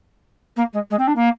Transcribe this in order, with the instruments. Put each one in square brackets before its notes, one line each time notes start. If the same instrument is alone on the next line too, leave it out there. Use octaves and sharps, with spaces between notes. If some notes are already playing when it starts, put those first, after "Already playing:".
[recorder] A#3
G#3
G#3
C4
D4
A#3